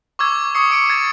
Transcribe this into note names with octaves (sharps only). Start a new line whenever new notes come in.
C#6 D6 E6 G#6
C#6 D#6 C7 C#7
D6 C#7 D7
G#6 A6 C7